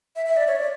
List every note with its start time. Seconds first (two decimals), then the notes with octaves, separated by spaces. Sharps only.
0.16 E5
0.26 E5
0.36 D5
0.47 C#5
0.56 D5